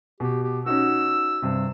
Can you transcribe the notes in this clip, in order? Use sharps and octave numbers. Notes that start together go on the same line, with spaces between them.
B2 G4
G4
C#4 D#4 F#4 E6
G2 C3